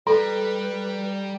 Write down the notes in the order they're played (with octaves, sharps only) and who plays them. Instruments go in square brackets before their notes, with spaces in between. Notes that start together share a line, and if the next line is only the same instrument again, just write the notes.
[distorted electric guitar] G3 [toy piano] A4 [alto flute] B4 [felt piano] A#5